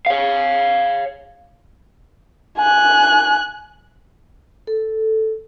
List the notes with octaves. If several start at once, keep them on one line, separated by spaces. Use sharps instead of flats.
C#5 F5
G#5 F#6
A4